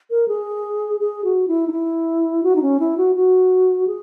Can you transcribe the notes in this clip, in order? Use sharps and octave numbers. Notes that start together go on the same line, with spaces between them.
A#4
G#4
G#4
F#4
E4
D#4
E4
F#4
D#4
C#4
E4
F#4
F#4
G#4